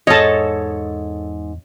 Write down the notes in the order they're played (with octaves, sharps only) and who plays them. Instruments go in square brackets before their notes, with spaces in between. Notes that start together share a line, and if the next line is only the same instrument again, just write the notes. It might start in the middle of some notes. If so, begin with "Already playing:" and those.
[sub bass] E2 [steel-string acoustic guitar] G#2 [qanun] A4 C#5 [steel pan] D#5 A5